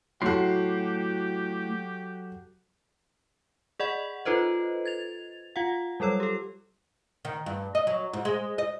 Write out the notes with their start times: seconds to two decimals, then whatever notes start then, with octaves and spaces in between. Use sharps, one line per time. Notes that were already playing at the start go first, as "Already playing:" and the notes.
0.22 F#3 A3 E4 F#4 G4 A4 C6 C7
3.79 G#4 D5 D#5 F#5 B5
4.25 D#4 F4 A4 B4 C5 D#5
4.86 G#6 A6 F7
5.56 F4 F5 F#5
6.00 F#3 G3 A4 C#5 E6
6.20 G4 A4
7.25 D#3
7.46 G2
7.75 D#5
7.87 F#3
8.13 G#2
8.25 G#3
8.58 D#5